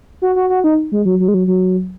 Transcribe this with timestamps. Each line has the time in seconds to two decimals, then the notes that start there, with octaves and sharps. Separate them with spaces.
0.22 F#4
0.36 F#4
0.50 F#4
0.64 D#4
0.92 G#3
1.05 F#3
1.20 F#3
1.28 G#3
1.34 F#3
1.47 F#3